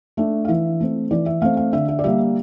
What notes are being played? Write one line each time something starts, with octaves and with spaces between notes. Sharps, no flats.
A3 D4 E5
F5
E3 E5
A3 C4
E3 D5
E5
A3 C4 F5
F5
D3 E5
E5
D5
G3 A#3 E5